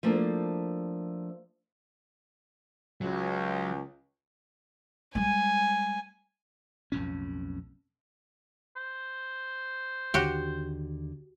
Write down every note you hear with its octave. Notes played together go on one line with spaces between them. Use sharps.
F3 A3 A#3 D4 E4 C5
C#2 F#3
G3 G#3 G#5
B1 F2 A2 C#4
C5
D#2 D3 F#4 G4